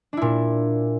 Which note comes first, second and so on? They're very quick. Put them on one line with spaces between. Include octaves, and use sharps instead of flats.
D4 E4 A#2